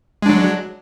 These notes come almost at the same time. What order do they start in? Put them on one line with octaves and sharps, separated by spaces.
G#3 D4 F#3